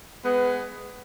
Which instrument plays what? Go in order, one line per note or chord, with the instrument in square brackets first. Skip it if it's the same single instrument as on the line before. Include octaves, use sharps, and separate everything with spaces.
[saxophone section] G#3 B3